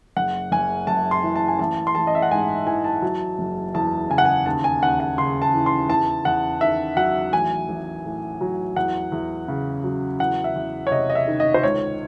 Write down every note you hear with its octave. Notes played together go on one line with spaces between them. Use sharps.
F#1 F#5
F#1 G#5
F#2 A5
C6
E3
A5
G#5
A1 A5
C6
A1 A5
D#5
E5
F#5
G#2 G#5
E3 G#5
A5
F#3
F#1
E2 A5
C#3 G#5
F#5
G#5
D#2 A5
G#5
D#2 F#5
F#5
C#3 C6
A5
E3
C6
E2 A5
E2 F#5
D#3 E5
F#3 F#5
A1 G#5
A1
A2
F#3
E2 F#5
E2
C#3
F#3
E2 F#5
E5
E2
C#5
C3 D#5
D#5
E5
D#3
D#5
C5
C#2 C#5